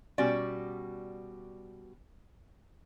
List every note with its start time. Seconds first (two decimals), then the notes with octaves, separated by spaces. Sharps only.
0.18 B2 G3 C#4 F#4 D5 G5